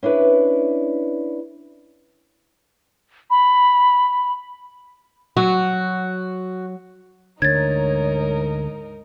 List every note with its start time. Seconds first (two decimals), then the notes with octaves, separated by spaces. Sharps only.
0.03 C#4 D4 E4 B4
3.30 B5
5.37 F#3 F#4
7.42 D2 G#2 D3 D#4 A#4 C#5 G#6 A6